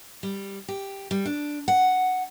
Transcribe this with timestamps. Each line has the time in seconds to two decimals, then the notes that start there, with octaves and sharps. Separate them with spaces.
0.23 G3
0.68 G4
1.11 G3
1.26 D4
1.68 F#5